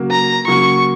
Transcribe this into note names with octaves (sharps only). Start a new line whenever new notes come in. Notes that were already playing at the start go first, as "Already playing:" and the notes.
Already playing: C#3 F#3 A#3
A#5
C#3 F#3 A#3 C#6